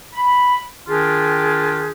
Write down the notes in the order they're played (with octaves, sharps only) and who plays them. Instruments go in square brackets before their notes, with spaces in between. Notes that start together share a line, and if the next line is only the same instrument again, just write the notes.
[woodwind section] B5
D#3 D4 F4 G4 G#4